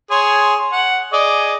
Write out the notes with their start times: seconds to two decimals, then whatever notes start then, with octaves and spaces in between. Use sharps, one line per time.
0.11 G#4 C#5 C6
0.72 F#5
1.13 G#4 D5 D#5